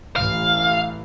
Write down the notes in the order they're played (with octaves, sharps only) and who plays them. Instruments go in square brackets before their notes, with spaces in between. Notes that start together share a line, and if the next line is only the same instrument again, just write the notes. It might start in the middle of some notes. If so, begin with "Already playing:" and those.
[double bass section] A1 A2 E3 [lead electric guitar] F5